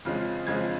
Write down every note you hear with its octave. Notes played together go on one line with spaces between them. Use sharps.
F2 C#3 F3 G#3 F6
F2 C#3 F3 G#3 G#6